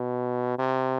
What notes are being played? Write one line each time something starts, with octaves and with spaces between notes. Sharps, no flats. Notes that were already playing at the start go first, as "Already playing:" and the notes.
Already playing: B2
C3